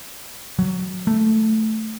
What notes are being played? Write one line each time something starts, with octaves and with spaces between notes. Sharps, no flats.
F#3
A3